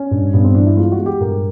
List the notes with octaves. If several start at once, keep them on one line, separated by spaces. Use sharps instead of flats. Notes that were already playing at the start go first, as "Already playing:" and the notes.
Already playing: C#4
G2
G2 B3
C4
E3 D4
E4
G#3 F4
F#4
G#3
G4
G2 A#4